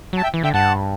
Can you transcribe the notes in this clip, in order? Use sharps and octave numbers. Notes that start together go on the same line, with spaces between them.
F#3 A5
E5 G5
E3
D3 E5 G5
G2 F#5 A5